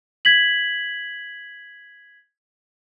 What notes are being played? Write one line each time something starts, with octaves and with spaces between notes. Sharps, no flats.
G#6 B6 F#7